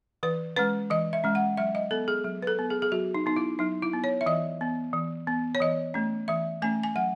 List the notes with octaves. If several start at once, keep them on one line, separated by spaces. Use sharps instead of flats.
E3 B4
G#3 C#4 B4
E3 D#5
E5
G#3 C#4
F#5
F#3 E5
D#5
B3 A4
G#4
F#3
B4
A4
B3
G#4
G#4
F#3 F#4
D#4
B3 D#4
E4
F#3 D#4
E4
B3
C#5
E5
E3 D#5
B3
E3
B3
C#5
E3 D#5
A3 C#4
E3 E5
A3 C#4 G#5
G#5
F#3 F#5